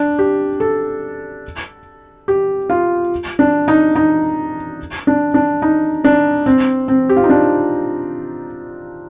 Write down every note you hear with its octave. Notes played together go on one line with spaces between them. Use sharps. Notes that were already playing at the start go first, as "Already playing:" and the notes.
Already playing: D4
G4
A4
G4
F4
D4
D#4
D#4
D4
D4
D#4
D4
C4
C4
G4
F4
D#4
D4